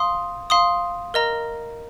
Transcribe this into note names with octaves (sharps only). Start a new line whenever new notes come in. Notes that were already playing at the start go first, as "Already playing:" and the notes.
Already playing: F5 C6 D#6
F5 C6 D#6
A#4 D#5 A#5